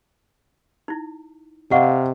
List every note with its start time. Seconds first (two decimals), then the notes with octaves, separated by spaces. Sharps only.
0.88 D#4 E4
1.71 C3 D#5 F5 F#5 C#6